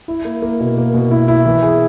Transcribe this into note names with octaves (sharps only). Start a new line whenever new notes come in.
E4
A#3
A#3
B2
A#3
B2
E4
E4
E3
G#4